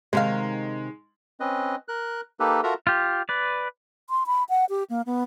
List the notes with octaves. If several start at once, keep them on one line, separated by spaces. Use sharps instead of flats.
C3 D#3 G#3 F5
C4 C#4 B4 D#5
A#4 F#6
A#3 D#4 G4 A4 B4
F4 F#4 A4 A#4 E5 A#5
F4 G4
B4 D5
C6
B5
F#5
G4
A#3
B3